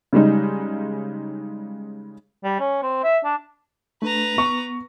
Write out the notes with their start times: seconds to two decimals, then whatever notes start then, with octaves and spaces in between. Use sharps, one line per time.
0.13 C#3 G3 G#3 D#4
2.44 G3
2.60 C#4
2.83 C4
3.03 E5
3.24 D4
4.02 A3 D4 B4 A#5
4.38 B3 C#6